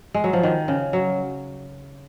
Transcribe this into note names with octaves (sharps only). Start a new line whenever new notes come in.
G#3
F#3
F3
D#3
C#3
F#3